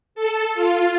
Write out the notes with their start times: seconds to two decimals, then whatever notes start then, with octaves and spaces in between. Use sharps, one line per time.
0.15 A4
0.54 F4